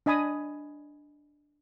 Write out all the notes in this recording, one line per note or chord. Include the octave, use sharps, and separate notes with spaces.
D4 D#5 G#5 B5 D#6